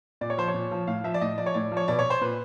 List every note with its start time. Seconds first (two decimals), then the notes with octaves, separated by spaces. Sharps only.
0.21 A#2 D5
0.30 C#5
0.38 F3 C5
0.48 C#5
0.54 A#2
0.71 F3
0.87 A2 F5
1.04 F3 E5
1.14 D5
1.21 A2 D#5
1.38 F3 D5
1.46 C#5
1.54 A2 D5
1.72 F3
1.77 C#5
1.88 B2 D5
1.99 C#5
2.10 C5
2.21 A#2 B4